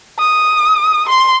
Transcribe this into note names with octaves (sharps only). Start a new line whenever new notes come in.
D#6
C6